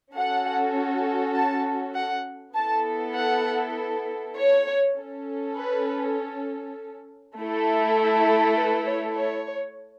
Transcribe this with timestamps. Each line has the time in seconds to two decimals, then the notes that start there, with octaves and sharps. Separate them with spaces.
0.15 C#4 F#4 A4 F#5
1.35 A5
1.95 F#5
2.55 B3 E4 A4 A5
3.16 F#5
4.36 C#5
4.97 C#4 A4
5.57 B4
7.37 A3 E4 A4
8.57 B4
8.87 C#5
9.17 C#5